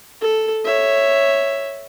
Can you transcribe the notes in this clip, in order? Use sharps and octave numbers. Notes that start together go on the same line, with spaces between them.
A4
C#5 E5